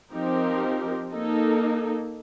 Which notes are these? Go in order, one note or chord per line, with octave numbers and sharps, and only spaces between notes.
F3 C4 D#4 G4 A#4
A#3 D#4 A4